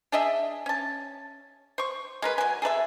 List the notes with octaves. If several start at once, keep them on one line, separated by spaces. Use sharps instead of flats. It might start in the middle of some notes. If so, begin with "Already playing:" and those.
D4 G#4 D#5 E5
C#4 A5
C5 C#6
G#3 A#4 B4
F#3 G#5
G#4 A4 B4 E5